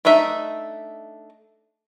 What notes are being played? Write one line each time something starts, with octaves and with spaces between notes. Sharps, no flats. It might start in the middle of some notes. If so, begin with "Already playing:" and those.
A3 D4 D#4 E5